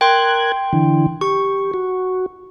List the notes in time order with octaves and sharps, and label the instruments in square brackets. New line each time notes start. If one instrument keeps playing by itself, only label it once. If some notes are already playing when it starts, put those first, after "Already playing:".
[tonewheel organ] A#4 F#6 G#6 [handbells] G5 C6
[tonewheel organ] D3 E3
[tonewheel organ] G4 [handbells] C#6
[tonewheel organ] F#4